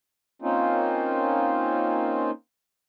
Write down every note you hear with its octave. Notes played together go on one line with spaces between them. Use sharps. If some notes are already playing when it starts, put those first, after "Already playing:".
A#3 C4 C#4 D#4 F4